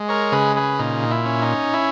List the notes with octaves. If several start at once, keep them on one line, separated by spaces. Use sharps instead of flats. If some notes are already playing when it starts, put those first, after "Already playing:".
Already playing: G#3
A#4 C#5
C#3 G#4 B4
G#4 B4
A#2 D#4
E4
C#4
D#4
E4